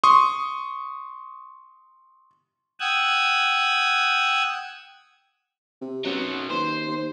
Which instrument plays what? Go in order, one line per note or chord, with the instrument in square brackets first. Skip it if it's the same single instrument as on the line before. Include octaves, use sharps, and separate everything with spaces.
[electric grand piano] C6 C#6 D#6
[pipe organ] F#5 G5 D#6 E6 F#6 G#6
[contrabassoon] C3
[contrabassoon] F#2 [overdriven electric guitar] F#3 B3
[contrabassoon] D#2 [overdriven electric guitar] C5
[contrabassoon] D#2